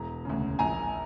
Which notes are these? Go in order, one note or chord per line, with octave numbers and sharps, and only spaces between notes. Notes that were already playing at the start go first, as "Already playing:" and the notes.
Already playing: E1 A#5
D2 C#3
A#1 G#5 A#5